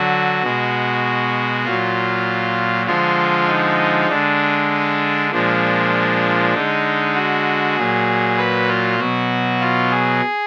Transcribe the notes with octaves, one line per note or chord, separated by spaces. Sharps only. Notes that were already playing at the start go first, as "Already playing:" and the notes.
Already playing: D3 F#3 F#4
B2 G#3
A#2 F#3 F4
D3 F3 G#3 F4
D#4
D3 G#3 D4
A#2 F3 G#3 D4
D3 G#3 D#4
F#4
A#2 F#3 G#4
B4
F4
B2 F#3 F#4
F4
G#4